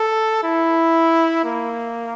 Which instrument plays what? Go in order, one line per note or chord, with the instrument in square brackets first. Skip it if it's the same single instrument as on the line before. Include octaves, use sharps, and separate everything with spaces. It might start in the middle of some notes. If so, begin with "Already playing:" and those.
Already playing: [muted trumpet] A4
E4
A#3